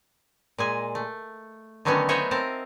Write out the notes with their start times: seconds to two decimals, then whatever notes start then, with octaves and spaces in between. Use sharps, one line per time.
0.58 A#2 G#3 G#5
0.95 A3
1.85 D3 D#3 F#3 A3 B3 C#4
2.09 B3 D#4 C5 C#5 E5 F#5
2.31 C4 A#4 A5